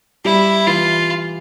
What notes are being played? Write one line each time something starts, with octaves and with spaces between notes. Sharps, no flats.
G3 E4
E3 F4